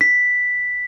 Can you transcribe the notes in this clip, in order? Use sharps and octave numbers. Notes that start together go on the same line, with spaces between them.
B6